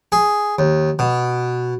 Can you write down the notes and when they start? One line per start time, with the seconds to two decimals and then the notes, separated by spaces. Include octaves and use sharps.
0.12 G#4
0.59 D#2
0.99 B2